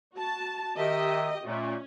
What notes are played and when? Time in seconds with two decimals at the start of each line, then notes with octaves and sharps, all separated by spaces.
0.15 F#4 A5
0.78 D#3 G4 D#5 E5
1.45 A#2 A3 C#4